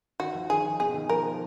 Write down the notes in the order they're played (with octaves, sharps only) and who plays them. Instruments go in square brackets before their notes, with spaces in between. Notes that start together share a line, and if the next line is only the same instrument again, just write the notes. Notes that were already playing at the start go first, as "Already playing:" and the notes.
[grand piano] D#3 [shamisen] F#4
[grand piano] F3
[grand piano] D#3 [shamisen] G#4
[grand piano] D#3
[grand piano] B2 [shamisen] G#4
[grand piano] D#3
[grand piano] F3 [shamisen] A#4